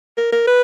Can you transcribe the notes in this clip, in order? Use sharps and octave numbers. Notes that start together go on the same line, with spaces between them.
A#4
A#4
B4